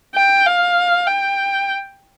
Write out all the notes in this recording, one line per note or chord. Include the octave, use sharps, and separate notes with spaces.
G5
F5
G5